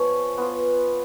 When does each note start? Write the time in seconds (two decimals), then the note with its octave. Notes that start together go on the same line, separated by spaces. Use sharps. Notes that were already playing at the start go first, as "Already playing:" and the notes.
Already playing: F3 B3 F4 C#5 G#5
0.38 B3 F4